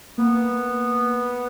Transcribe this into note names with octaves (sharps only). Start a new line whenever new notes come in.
A#3 B3